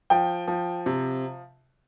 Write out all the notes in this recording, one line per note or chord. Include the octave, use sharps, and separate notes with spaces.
F3 G5
F3
C3